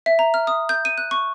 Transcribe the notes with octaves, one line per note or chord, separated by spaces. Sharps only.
E5
A#5
F6
D#6
G6
D#7
F#6
C#6